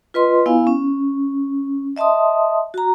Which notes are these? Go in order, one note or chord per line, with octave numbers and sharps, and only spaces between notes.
F4 B4 D#5 C6
B3 E4 F5 G#5
C#4
D#5 E5 A5 C6 D#6
F#4 A#5